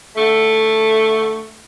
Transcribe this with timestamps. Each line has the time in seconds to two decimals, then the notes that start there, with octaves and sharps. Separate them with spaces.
0.16 D3 A3